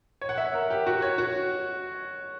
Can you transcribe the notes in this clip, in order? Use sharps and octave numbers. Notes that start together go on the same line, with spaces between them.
C#5
F#5
E5
A#4
G4
F#4
C#5
F#4